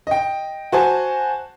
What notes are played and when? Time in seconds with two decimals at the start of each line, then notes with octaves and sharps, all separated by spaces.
0.07 D#5 G5
0.72 F#4 C5 G#5 A5